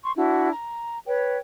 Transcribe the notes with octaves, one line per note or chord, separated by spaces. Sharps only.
C6 C#6
D4 E4 F#4
A#5
B4 C#5 G5